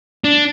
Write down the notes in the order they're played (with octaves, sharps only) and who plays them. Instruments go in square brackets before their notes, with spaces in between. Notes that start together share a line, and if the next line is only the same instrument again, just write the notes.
[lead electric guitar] D4